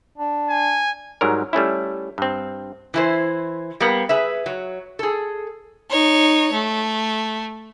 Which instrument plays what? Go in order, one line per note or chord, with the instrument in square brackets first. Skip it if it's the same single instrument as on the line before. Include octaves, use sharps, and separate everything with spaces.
[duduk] D4
[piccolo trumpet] G#5
[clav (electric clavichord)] G#2 F#3 G3 A#4
G3 A3 C#4 E4
G2 C4
[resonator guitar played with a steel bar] E3 E4 C5
G3 A#3 B3
G#4 B4 E5
F#3
G#4 A4
[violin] D#4 C#5
A3